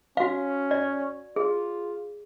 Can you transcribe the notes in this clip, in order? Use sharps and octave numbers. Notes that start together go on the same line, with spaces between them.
C#4 F#4 F5
D5
F4 G#4